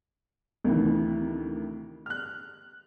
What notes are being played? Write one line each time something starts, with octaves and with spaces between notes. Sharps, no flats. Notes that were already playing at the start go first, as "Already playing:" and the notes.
D2 C3 D#3 E3
F6 F#6